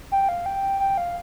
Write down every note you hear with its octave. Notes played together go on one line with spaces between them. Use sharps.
G5
F5
G5
G5
F5